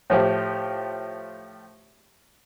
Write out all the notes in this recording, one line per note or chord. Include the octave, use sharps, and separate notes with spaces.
A2 F3 G4